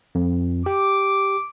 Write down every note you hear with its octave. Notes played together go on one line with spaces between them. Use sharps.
F2
G4 D6